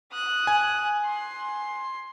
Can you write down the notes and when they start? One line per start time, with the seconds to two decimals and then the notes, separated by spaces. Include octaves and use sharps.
0.13 D#6 F#6
0.47 G#5
1.06 C6